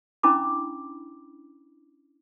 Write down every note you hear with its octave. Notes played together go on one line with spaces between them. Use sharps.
C#4 D4 E4 B5 D6